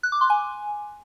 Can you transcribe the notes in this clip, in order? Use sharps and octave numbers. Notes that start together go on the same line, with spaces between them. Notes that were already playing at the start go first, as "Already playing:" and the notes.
F#6
D6
C6
G#5